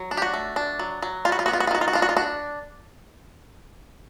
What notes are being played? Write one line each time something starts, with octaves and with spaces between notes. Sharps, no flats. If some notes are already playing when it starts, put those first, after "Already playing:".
Already playing: F#3
D4
G4
F#4
A3
D4
F#3
F#3
G3 F4
F#4
F4
B3 F#4
F4
F#4
F4
D#3 F#4
F4
F#4
D4 F4
F#4
F4
D4 F#4